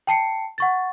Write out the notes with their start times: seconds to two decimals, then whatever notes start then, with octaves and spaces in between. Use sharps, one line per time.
0.07 G5 A5 C7 C#7
0.58 F#5 C#6 A6